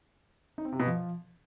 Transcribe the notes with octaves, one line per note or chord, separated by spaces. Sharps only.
D#4
C4
C3
B2
F3